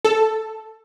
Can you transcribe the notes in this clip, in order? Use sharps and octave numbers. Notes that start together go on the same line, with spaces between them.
A4